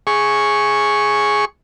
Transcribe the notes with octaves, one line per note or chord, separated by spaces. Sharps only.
G#4 C#6